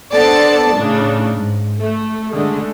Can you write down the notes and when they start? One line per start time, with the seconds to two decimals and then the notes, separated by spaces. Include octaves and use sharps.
0.12 B3 D4 A4 C5 D5 A5
0.77 A2 C#3 D4 D#4
1.35 G#2
1.79 A3
2.31 D3 G#3 A3